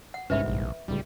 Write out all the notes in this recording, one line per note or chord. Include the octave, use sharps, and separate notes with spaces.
F#5
G1 C2 G#2 C#4 B4 E5 B5
A#1
D1 C#2 G3